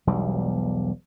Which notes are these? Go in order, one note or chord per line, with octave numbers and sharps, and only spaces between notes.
E1 B1 G3